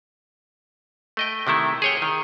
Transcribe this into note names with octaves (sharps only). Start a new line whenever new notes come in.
A3 D#5 G5
C3 D#3 A3 E4
G#4 C#5 G5
D#3